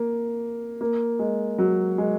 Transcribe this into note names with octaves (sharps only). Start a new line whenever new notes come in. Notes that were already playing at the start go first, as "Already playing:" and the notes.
Already playing: A#3
A#3
G#3
F#3
G#3